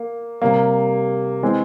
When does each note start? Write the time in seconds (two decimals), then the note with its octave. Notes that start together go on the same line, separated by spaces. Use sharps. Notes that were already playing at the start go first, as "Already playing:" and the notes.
Already playing: A#3
0.42 C3 G3 A#3
1.42 E3 G#3 C4